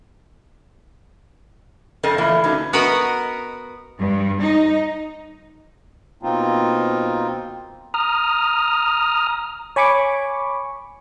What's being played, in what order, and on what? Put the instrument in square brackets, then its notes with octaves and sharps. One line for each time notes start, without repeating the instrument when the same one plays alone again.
[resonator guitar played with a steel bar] F2 C4 A4 A#4 D#5
E2 A#2 E3 A3 A#3 F4
D3 F#3 A3 B3 C#4 D#4
[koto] B3 F#4 A#4 B4 D#5
[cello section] G2
D#4
[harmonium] B2 A#3 C4 D#4 F4
[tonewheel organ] A#5 D#6 F6
[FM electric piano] C#5 G#5 B5 C#6 D6